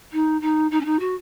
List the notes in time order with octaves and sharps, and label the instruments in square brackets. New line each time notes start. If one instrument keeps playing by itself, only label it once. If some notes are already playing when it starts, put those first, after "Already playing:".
[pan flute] D#4
D#4
D#4
C#4
D#4
F#4